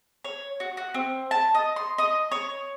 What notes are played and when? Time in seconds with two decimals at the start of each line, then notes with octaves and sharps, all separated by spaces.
0.25 C#5
0.60 F#4
0.77 F#4
0.94 C4
1.31 A5
1.54 D#5
1.76 C6
1.98 D#5
2.31 C#5